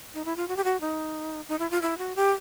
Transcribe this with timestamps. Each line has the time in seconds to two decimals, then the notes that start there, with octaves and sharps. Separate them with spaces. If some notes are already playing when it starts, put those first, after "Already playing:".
0.14 D#4
0.25 E4
0.36 F4
0.48 F#4
0.57 G4
0.64 F#4
0.81 D#4
1.49 D#4
1.59 E4
1.71 F4
1.82 E4
1.98 F#4
2.16 G4